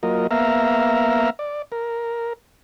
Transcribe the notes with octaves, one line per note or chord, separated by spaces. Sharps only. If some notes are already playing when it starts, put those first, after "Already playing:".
F#3 A#3 F4 A#4 D#5
A#3 B3 E5 F5 A#5
D5
A#4